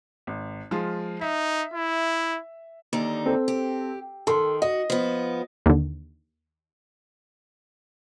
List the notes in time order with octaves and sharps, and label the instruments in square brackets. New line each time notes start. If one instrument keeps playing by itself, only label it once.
[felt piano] G#1
F3 G#3 F4
[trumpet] D#4 [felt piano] E5
[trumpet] E4
[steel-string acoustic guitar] D#2 D3 D#4
[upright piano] C4 A4
[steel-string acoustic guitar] G4
[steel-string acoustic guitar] D#3 [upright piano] A4 C6
[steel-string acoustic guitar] F#4 [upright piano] D#5
[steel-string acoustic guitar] F3 B3
[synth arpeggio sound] D#2 D3